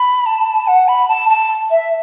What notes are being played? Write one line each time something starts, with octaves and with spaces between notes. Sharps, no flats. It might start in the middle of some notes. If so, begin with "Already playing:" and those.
Already playing: B5
A5
F#5
B5
A5
A5
E5